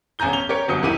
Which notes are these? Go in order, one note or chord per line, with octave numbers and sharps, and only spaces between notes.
E1 A1 G#5 A#5 G6 G7
C#4 F7 G7
G4 A#4 C#5 C#7
G1 F#3 D#6 G6 C#7
D#1 D#3 E4 G4 D#7